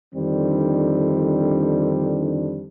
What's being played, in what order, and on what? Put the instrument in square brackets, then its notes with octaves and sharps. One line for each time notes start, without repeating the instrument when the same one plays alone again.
[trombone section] F2 D3 D#3 G3 C4 D4